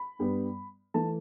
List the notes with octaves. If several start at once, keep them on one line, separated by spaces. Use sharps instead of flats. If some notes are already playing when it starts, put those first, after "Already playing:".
Already playing: B5
G2 G3 B3
E3 A3 A5